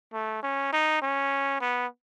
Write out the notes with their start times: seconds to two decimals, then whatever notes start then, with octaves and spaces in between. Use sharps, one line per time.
0.13 A3
0.43 C#4
0.72 D#4
1.02 C#4
1.61 B3